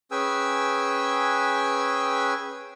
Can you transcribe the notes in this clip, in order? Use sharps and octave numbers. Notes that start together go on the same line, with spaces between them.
C#4 G#4 B4 G5 G#5 E6